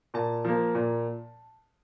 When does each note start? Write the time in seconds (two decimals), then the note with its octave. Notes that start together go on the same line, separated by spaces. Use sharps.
0.14 A#2 A5
0.45 F3 A#3
0.75 A#2